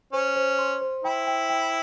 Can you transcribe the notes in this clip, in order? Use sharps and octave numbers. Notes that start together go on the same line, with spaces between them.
C#4 C5
C5
C6
C5
E4 G5
G5
G5